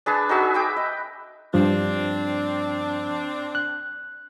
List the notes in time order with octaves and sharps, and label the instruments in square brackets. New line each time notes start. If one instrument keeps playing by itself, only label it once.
[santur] D4 G#4 B4 A5
D#4 F#4 G#4 E5
B4 G5 D6
D#5
[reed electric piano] G2 F3 [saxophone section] C4 D4
[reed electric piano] F#6